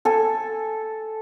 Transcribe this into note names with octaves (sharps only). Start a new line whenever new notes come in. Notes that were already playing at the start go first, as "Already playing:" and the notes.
A4 G#5